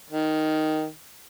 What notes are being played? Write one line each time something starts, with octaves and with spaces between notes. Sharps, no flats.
D#3